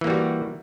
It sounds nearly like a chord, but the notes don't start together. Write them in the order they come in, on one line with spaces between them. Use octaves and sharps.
E3 A#3 G3 F#4